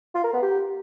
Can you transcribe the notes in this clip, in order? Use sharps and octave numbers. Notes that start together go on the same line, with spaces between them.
F4
A#4
B3
G4